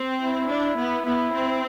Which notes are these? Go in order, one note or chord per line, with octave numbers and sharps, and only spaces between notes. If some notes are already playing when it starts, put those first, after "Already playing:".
Already playing: C4
E4
D4
B3
B3 E4
C4